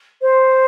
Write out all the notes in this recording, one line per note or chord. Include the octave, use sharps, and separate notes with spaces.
C5